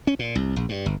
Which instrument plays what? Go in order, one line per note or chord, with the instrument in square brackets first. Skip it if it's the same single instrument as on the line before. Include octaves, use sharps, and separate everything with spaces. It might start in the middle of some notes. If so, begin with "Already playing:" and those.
[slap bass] C#4
A#2
C2
A#1
G2
G1